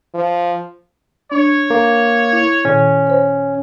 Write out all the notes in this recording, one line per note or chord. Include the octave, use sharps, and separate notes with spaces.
F3
D4 C#5
A#3
E4
A#2 D#3 C#4
C5 C#5